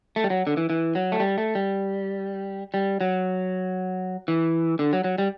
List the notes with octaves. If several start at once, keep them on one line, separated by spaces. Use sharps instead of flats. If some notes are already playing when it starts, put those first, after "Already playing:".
A3
G3
F#3
D3
E3
E3
F#3
A3
G3
A3
G3
G3
F#3
E3
D3
F#3
F#3
G3